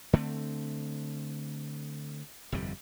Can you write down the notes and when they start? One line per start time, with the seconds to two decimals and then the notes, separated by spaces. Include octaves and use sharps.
0.13 D3 A3 C4
2.52 G1 F2 C3 G3